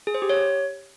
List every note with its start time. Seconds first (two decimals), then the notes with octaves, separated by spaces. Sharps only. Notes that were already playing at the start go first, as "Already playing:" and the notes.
0.07 G#4
0.14 C5
0.22 G4
0.29 C#5